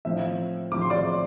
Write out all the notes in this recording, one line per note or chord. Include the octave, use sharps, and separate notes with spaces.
A2 F3 C4 E5
A2 F3 C4 D6
C6
D5 D6